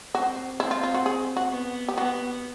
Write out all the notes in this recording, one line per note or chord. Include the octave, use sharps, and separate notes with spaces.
C4 F#4
C4 E4
F4
F4
F#4
G#4
F#4
B3
G4
B3 F#4